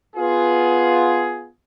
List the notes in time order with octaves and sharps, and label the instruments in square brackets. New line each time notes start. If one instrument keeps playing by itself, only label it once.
[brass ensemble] B3 F4 G#4